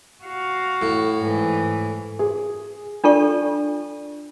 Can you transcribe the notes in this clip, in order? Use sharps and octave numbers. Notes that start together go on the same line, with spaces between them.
F#4 F5
A2
G#2 E3
G#4
D4 F4 A4 D5 C#6